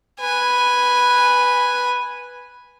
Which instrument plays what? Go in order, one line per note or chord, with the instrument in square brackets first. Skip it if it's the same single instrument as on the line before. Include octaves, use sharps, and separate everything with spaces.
[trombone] B4 [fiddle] G#5